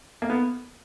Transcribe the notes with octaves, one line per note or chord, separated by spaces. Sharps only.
A#3
B3